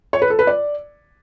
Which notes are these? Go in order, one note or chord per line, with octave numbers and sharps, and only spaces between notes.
C#5
B4
A4
B4
D5